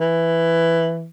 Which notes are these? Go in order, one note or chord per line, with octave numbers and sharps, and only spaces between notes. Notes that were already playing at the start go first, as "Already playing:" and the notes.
E3